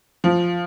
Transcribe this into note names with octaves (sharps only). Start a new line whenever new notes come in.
F3